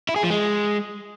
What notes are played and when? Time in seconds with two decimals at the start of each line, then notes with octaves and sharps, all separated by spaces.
0.09 E4
0.16 G#4
0.23 F3
0.30 G#3